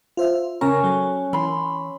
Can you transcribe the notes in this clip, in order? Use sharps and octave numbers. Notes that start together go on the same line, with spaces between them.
F4 C5 E5
C#3 C#4 A#4 A#5
F#3 A4
E3 B5 C6